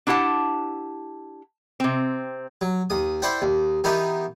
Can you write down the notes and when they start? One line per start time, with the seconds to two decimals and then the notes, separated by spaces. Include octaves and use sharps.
0.07 D4 E4 G4 F#5 A5
1.80 C3 C4
2.61 F#3
2.90 D#2 D#6
3.22 E4 C5 D5 F#5 G5
3.42 D#2
3.84 E3 B3 D#4 G4 A#4